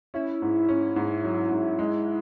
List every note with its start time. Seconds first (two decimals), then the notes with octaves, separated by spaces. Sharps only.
0.14 C#4 E4
0.42 G#2
0.69 C#4
0.96 G#2
1.24 F#3
1.51 G#2
1.79 G#3